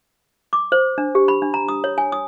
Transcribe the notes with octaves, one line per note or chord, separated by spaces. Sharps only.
D6
C5
D4
G4
B5
D4
A#5
D#6
C#5
G#5
D#6